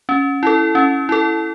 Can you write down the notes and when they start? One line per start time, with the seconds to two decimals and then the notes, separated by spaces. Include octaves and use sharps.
0.09 C#4
0.43 E4 A4
0.75 C#4
1.09 E4 A4